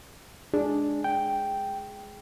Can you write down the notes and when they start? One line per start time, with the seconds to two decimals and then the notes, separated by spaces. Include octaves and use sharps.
0.54 D4 G#4
1.04 G5